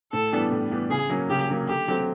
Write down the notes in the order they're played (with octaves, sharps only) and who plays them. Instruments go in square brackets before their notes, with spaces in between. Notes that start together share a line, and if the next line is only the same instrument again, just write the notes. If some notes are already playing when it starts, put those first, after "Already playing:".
[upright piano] A2 [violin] A4
[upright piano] E3 G3 B3 D4
A2
E3 G3 B3 D4
[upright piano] C#3 [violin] G#4
[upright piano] F#3 A#3 C#4
[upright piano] C#3 [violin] G4
[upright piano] F#3 A#3 C#4
[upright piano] D3 [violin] G4
[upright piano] F#3 A3 C4